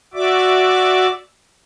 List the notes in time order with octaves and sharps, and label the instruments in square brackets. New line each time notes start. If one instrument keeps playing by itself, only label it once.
[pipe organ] F#4 D5 E5 D6